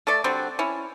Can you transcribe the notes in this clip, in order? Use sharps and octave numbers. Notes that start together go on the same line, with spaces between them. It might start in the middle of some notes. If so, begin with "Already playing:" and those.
A3 A4 D5
D3 G3 C4 F#4
C#4 E4